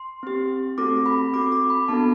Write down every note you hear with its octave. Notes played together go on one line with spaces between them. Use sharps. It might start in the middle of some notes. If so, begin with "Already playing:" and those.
Already playing: C6
C4 G4
A3 C4 F#4 A4 D6
B5
C4 F#4 A4 D6
D6
B5
B3 D4 F#4 A4 A5